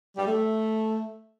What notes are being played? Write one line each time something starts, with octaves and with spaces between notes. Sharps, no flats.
G3
A3